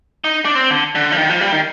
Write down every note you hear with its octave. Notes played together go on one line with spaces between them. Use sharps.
D#4
D4
C4
D3
D3
F3
D#3
F3
G3
D#3